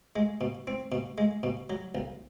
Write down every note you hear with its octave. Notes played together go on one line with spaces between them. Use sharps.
G#3
B2
C4
B2
G#3
B2
F#3
B1